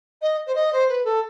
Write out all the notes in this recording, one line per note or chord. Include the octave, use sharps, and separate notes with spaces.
D#5
C5
D#5
C5
B4
A4